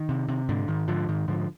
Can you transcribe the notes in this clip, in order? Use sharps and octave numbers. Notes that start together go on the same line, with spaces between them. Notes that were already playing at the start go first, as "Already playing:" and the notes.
Already playing: D#3
C3
C3
G#2 D3
G#2 D#3
G#2 D3 F3
G#2 D#3
G#2 D3 F3